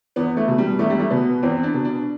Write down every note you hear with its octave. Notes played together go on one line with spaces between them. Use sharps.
E2 B3
A3
B2
G3
E2 A3
G3
A3
B2 B3
E2 C4
D4
B2
D4